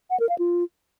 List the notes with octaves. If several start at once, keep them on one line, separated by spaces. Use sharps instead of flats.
F#5
A#4
F5
F4